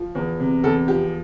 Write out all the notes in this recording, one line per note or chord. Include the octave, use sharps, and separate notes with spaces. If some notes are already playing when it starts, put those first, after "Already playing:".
Already playing: F3
E2
C3
E2 A4
F3 G4